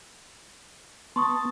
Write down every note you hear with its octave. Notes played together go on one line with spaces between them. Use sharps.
B3 A5 C6 C#6 D#6